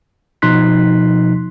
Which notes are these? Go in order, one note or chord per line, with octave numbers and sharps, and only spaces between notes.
B2 F3 D#4 C6 F#6 B6